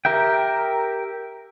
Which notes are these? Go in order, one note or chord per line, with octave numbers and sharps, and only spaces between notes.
G4 A#4 E5 G5